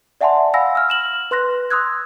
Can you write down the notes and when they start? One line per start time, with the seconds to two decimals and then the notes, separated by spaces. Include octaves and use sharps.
0.21 D5 E5 F#5 G#5 A5 C6
0.54 F5 F#5 G#5 B5 E6 A#6
0.75 E6 F6
0.89 F6 E7 F#7
1.31 B4 C6 F#6 A#6
1.70 C6 D#6 E6 F#6 G#6